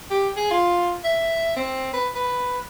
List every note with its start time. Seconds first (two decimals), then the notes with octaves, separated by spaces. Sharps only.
0.11 G4
0.36 G#4
0.51 F4
1.04 E5
1.56 C4
1.94 B4
2.15 B4